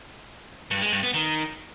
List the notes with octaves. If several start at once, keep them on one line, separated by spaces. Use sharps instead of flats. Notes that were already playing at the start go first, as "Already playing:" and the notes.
G2
G#3
G2
B3
D#3